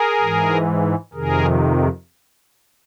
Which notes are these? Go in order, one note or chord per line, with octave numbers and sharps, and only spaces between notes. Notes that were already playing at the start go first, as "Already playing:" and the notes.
Already playing: G#4 A#4
G#2 E3
F2 C3 D#3 G#4 A#4